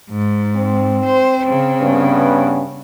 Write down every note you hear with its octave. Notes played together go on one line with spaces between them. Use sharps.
G#2
C4
C5
C#3
G2 B3 C#4